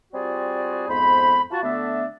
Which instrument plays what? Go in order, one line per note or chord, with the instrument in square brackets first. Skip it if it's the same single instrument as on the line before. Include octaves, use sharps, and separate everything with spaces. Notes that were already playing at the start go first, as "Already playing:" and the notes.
[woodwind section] G3 C4 F4 F#4 G#4 D5
F2 G#2 B3 C5 B5
F4 F#4 A5
D3 A3 B3 D4 E5